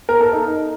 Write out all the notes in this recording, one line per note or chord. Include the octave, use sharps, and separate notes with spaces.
A#4
A4
D#4